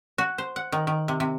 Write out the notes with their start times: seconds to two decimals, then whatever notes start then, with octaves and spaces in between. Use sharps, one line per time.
0.18 F#4
0.38 C5
0.56 F#5
0.72 D#3
0.87 D#3
1.08 C3
1.20 C3